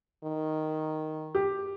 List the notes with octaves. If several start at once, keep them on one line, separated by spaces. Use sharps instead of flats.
D#3
G4